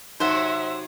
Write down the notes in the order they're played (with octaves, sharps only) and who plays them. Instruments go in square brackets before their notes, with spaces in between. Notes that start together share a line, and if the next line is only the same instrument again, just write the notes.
[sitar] C3 F#3 [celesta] D#4 [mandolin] C5 F#5 [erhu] E5